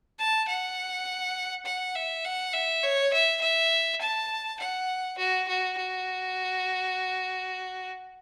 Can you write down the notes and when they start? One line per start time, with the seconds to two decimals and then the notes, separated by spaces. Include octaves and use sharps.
0.19 A5
0.48 F#5
1.66 F#5
1.95 E5
2.25 F#5
2.53 E5
2.83 C#5
3.13 E5
3.41 E5
4.01 A5
4.60 F#5
5.18 F#4
5.48 F#4
5.78 F#4